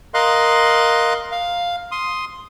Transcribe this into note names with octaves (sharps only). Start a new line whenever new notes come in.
A#4 D#5 F5 C6 F#6
F5
C6 D#6